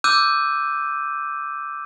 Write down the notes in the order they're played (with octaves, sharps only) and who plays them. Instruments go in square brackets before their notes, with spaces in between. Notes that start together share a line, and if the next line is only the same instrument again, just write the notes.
[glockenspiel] D6 E6 F#6 G6 D#7